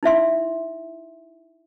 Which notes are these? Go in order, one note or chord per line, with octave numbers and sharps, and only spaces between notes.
D#4 E4 E5 C6